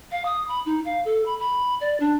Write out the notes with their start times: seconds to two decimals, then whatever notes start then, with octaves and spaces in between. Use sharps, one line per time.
0.11 F5
0.25 D#6
0.48 B5
0.66 D#4
0.85 F5
1.05 A4
1.25 B5
1.40 B5
1.81 D5
2.00 D4